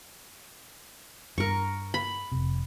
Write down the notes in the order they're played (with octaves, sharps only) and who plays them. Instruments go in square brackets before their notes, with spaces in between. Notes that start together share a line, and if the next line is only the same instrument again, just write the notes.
[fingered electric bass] G2 [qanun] A#4 C#6
[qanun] B5
[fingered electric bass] F1 C3